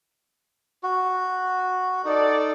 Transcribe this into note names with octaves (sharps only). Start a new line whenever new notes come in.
F#4
D#4 A4 D5